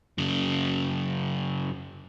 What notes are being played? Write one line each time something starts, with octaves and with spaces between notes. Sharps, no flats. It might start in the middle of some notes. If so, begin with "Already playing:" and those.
F#2 C#3